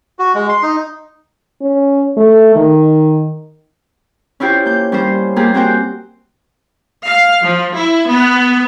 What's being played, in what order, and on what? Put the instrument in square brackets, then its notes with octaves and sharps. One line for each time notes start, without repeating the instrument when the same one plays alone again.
[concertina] F#4
G#3
C6
D#4
[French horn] C#4
A3
D#3
[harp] C#4 E4 F4 G4 C5 G5
A#3 G6
G3 C#4 F4 C5
A#3 F4 G4 G#4
A#3 C4 F#4 C5 G5
[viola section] F5
F3
E4
B3